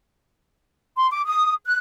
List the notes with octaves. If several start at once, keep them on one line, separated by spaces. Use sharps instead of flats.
C6
D6
D#6
F#6